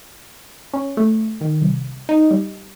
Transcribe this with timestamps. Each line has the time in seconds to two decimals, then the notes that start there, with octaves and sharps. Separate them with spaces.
0.74 C#4
0.97 A3
1.41 D#3
1.61 C2
2.09 D#4
2.30 G3